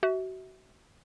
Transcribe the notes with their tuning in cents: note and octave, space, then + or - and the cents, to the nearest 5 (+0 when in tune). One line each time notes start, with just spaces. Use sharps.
F#4 +30 E5 -20